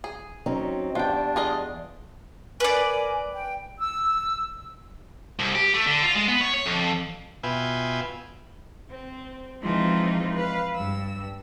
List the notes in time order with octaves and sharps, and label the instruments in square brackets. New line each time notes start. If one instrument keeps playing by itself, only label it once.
[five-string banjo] G#4
[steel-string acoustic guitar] F#3 C#4 D#4 [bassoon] C4
[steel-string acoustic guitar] E2 [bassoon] G3 [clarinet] D4 [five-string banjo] F4 G5
[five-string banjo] F4 G#4 D#5
[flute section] A#4 G#5 [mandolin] B4 D5
[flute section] G5
[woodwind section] E6
[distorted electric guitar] C2
G4
A3
D3
F4
G#3
B3
C#5
C#5
F2
[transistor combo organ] B2 F4 B4 E5 G5 G#5
[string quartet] C4
E3 F3 G#3 C4 D#4 F4
B4 F5
G2 E6